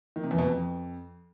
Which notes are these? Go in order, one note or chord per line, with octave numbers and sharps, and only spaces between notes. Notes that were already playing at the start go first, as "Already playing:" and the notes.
D#3
C3
E2
B2
F2